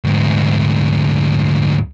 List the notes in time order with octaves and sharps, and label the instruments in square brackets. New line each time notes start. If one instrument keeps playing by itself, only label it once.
[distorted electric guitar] D2 G#2